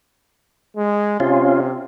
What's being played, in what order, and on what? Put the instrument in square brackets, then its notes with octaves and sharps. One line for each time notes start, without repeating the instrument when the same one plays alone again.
[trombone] G#3
[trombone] C3 [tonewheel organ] C#4 F4